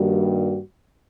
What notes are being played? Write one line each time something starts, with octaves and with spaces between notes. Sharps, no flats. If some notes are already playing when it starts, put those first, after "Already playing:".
Already playing: G2 D#3 G3 A#3 F#4